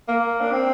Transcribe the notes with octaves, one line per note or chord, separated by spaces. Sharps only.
A#3
D4
C4